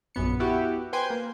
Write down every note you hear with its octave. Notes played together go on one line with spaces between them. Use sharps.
A#1 F#2 B3 C#7
B3 E4 F#4 G4
B4 C5 G5 G#5 C6
A#3